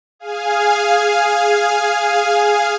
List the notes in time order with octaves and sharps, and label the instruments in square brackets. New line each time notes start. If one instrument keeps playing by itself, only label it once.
[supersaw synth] G#4 F5 G#5